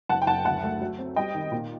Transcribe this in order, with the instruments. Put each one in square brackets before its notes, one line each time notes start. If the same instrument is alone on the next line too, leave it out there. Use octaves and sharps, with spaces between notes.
[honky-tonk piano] F#1 F#5 A5
G5
F#1 F#5 A5
D2 F#5 A5
A3
F#3
C4
G3 D#5 G5
D#3
A#2